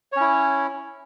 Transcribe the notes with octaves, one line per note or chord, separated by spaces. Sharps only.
C#4 E4 C#5